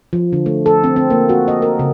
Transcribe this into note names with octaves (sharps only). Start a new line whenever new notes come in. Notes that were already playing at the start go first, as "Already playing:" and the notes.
F3
D3
A3
A4
C4
C4
A#3
F#4
D#5
A#4
C#3